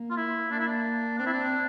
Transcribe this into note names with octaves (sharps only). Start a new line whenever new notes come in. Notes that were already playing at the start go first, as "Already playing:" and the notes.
Already playing: A#3
F4
E4
A#3 D4
E4
D4
C4 D4
E4
D4